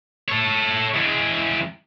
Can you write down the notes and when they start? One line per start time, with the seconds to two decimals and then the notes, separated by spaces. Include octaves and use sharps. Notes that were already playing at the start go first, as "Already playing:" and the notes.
0.28 A4 C#5
0.95 E2 G#3